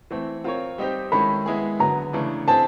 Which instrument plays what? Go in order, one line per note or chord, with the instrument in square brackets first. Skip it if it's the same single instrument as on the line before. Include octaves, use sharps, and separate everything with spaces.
[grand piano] E3 A3 C4
C4 F4 A#4 C#5
G3 C4 D#4 G4 C5
[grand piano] D#3 G#3 C#4 E4 A4 [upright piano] B5
[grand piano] G#3 B3 E4 G#4
[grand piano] D3 F#3 B3 [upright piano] A#5
[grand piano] C#3 E3 A3 D4
[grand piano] C4 E4 G#4 C5 [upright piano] A5